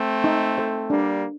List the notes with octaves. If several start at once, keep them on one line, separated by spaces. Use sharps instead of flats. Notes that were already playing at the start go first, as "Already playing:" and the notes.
Already playing: A3 C4
D#4
A4 C5
G3 A#3 D4